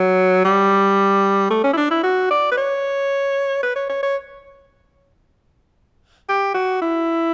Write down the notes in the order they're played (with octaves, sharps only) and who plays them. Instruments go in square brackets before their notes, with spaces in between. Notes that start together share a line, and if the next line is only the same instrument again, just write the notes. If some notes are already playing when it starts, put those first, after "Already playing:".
Already playing: [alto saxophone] F#3
G3
A3
C#4
E4
D4
E4
F#4
D5
B4
C#5
B4
C#5
C#5
C#5
G4
F#4
E4